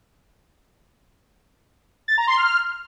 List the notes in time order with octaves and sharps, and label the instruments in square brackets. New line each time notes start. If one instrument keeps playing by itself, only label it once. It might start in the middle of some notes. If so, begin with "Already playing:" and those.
[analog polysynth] A6
A#5
C6
F6